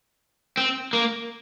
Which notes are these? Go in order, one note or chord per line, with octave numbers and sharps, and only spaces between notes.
C4
A#3